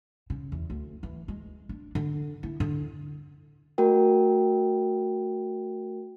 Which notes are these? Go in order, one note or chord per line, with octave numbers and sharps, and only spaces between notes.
C#3
E2
D2
E3
G#3
D4
D3
E4
D3
A3 F#4 A#4 G5